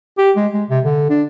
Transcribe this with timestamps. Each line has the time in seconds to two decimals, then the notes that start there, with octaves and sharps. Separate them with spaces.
0.18 G4
0.36 G#3
0.54 G#3
0.70 C3
0.84 D3
1.09 D4